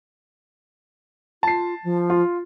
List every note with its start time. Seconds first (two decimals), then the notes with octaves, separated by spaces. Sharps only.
1.43 F4 A5 C7
1.84 F3
2.10 F4